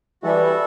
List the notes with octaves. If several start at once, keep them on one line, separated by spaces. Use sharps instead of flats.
E3 G3 F#4 A4 E5